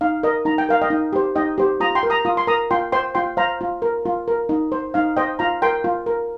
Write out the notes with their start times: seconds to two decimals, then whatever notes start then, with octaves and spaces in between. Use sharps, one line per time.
0.01 D#4 F5
0.23 A#4 D#5
0.45 D#4 A#5
0.58 G5
0.69 A#4 F5
0.82 D#5 G5
0.90 D#4
1.13 G4 C5
1.36 D#4 D#5 G5
1.58 G4 C5
1.80 F4 A#5 D#6
1.95 G5 C6
2.03 A#4
2.10 A#5 D#6
2.25 F4 D#6
2.37 C6
2.47 A#4 A#5 D#6
2.71 F4 G5 C6
2.92 C5 G5 C6
3.15 F4 G5 C6
3.37 C5 F5 A#5
3.61 F4
3.82 A#4
4.06 F4
4.28 A#4
4.49 D#4
4.72 C5
4.94 D#4 F5
5.17 C5 D#5 G5
5.39 F4 F5 A#5
5.62 A#4 G5 C6
5.84 F4
6.06 A#4